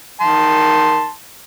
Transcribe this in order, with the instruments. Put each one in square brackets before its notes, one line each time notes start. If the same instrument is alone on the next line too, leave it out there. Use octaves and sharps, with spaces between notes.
[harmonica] D#3 A5 C6